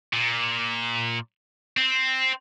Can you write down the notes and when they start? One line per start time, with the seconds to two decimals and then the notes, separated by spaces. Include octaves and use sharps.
0.13 A#2
1.77 C4